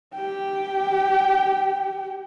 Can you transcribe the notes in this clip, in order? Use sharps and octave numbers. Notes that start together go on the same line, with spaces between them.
G4 G5